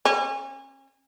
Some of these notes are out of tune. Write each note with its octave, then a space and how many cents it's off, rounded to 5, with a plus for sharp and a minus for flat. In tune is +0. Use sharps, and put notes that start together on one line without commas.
C#4 -35